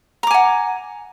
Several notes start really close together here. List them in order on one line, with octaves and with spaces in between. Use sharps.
A#5 D6 G#5 F#5